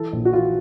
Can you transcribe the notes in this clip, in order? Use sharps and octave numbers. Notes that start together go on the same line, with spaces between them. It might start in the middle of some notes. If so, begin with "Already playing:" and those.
Already playing: E3 A4
A#1
F#4
E3 F4